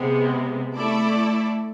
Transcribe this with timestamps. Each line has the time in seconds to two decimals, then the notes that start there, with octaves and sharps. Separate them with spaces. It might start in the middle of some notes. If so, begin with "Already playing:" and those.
Already playing: C3 G#3 B3
0.75 A3 E4 A4 D5